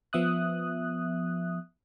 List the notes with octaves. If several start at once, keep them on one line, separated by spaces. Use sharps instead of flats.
F3 B3 E5 D#6 F#6